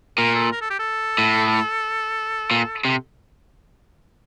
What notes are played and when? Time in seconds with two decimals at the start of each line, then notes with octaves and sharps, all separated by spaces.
0.18 A#2 A#4
0.35 A4
0.52 A#4
0.61 A4
0.70 G4
0.79 A4
1.18 A2
2.51 A#2
2.85 C3